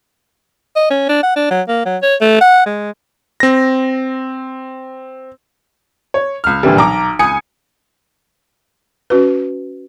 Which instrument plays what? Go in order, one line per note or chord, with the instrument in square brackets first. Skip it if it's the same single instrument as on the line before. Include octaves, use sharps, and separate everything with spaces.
[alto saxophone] D#5
C#4
D4
F#5
D4
F#3
A#3
F#3
C#5
A3
F#5
G#3
[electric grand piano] C4 A#6
[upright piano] C#5
C#2 F6
A#2 D3 E3 G3
B1 A#5 D6
C#2 G#5 D#6 G#6 C#7
[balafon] C#4 F#4 B4